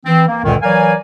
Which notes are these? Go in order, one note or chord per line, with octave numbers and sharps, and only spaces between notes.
E3 C4
A#3
C#2 F#2 A#2 D3 D#3
E3 F#3 A#4 D5 F5 G#5